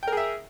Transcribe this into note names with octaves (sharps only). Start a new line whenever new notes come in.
G#4 A#4 E5 G5